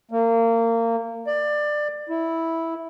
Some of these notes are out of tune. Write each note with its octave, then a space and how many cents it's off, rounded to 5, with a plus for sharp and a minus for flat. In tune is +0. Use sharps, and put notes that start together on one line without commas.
A#3 -25
D5 +20
E4 -5